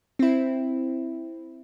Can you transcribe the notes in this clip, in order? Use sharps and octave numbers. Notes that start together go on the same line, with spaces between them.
C4 E4